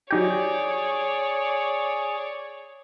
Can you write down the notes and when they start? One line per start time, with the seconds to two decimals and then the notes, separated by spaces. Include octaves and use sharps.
0.11 F#3 D#4 G4 G#4 C#5 D5